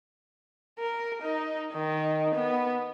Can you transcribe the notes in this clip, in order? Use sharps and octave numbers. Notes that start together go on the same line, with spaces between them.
A#4
D#4
D#3
B3